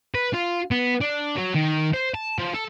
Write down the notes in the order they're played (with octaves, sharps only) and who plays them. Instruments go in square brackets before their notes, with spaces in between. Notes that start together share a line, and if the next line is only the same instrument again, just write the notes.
[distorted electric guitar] B4
F4
B3
D4
F#3
D#3
C5
A5
F3
A4